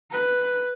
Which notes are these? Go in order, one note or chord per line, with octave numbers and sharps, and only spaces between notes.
B4